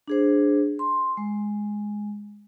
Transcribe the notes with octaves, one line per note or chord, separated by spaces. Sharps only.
D4 G#4 C5
C6
G#3